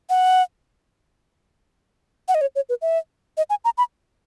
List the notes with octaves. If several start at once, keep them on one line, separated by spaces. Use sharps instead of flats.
F#5
F#5
D#5
C#5
C#5
B4
E5
D#5
G#5
A#5
B5